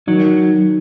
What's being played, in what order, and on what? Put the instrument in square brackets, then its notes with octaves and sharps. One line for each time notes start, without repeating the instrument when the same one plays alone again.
[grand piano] D#3 [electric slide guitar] F#3